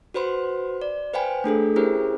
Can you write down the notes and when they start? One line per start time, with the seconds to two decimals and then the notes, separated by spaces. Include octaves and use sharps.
0.14 F#4 B4 C5 B5 C6
0.82 D5
1.14 B4 C5 F5 G5 G#5 B5
1.44 A3 D4 G#4 A4
1.76 C#4 E4 G4 G#4 A#4 C5